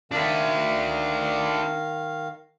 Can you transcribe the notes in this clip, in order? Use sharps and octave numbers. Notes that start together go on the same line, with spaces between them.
D#3 D4 E5 F5